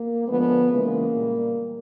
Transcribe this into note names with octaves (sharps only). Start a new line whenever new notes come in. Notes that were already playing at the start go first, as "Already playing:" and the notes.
Already playing: A#3
D3 F3 G#3 B3
C#3 E3 G#3 A#3
A#2 G3